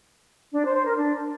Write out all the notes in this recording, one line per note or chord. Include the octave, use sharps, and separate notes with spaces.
D4
C5
C5
A#4
D4